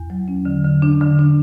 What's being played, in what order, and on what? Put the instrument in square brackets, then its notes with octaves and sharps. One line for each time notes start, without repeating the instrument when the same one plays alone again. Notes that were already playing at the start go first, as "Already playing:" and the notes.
Already playing: [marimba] E2
F#3
C#4
D3
D3
D4
D3
D4